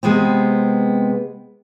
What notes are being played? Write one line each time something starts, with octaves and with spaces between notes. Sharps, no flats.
C3 G#3 B3 C4